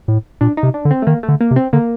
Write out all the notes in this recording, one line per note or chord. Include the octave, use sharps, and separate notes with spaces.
A2
A#2 D4
D#4
C3
D4
D3
C4
A3
D#3 A#3
A3
D3
A#3
C3
C4
D3 A#3